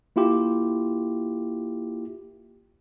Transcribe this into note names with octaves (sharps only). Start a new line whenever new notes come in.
A#3 E4 F4 G4